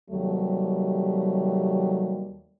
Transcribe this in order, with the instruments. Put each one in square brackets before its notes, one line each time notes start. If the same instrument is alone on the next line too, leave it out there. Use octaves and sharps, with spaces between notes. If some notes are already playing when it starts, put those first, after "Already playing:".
[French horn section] D#2 C3 F#3 G3 A3